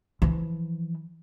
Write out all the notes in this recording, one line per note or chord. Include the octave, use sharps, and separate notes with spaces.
E3 F3